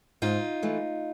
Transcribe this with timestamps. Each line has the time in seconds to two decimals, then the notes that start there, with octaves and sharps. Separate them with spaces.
0.22 G#2 D#4 F4
0.62 E3 A3